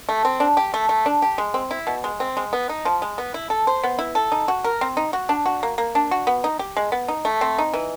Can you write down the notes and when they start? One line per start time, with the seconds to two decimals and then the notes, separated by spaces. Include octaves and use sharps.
0.09 A3
0.25 C4
0.40 D4
0.57 G4
0.74 A3
0.89 A3
1.06 D4
1.22 G4
1.38 G#3
1.54 C4
1.71 E4
1.87 B2
2.04 G#3
2.20 C4
2.37 G#3
2.53 B3
2.69 D#4
2.85 F3
3.02 G#3
3.18 B3
3.34 E4
3.50 A4
3.67 C5
3.84 B3
3.99 E4
4.15 A4
4.32 D#4
4.48 F#4
4.64 A#4
4.81 C4
4.97 D#4
5.13 F#4
5.29 D4
5.46 F#4
5.63 A#3
5.78 A#3
5.95 D4
6.11 F#4
6.27 B3
6.44 D#4
6.59 G4
6.77 G#3
6.92 B3
7.08 D#4
7.25 A3
7.41 C4
7.58 D#4
7.74 E3